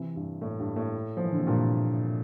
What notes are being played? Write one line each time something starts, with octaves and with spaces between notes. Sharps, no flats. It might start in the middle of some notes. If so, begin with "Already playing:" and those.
Already playing: C3 E3
G2
A2
G2
A2
F3
E3
D3
C3
G2 A#2